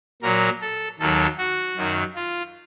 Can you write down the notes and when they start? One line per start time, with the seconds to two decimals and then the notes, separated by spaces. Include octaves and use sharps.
0.22 A#2 F#3 A#4
0.61 A4
0.99 D#2 D#3 F#3 A4
1.38 F#4
1.76 F#2 D#3 F#3
2.15 F4